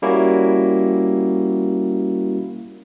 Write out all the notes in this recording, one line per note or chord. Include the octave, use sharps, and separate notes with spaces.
G3 A#3 C#4 E4 F#4